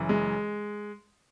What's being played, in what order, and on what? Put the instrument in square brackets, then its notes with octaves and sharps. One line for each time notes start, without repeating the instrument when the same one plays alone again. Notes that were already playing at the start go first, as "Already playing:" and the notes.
Already playing: [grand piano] F#1 F#2 E3
G#3